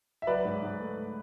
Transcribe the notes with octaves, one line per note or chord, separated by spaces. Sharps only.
E5
F#3 B4 D5
G#2
G#2
A3